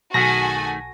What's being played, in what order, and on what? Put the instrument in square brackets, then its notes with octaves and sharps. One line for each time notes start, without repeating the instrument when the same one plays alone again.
[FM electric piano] B1 [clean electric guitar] D#3 A3 G#4 [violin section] F#4 A4 G#5 [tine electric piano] A#6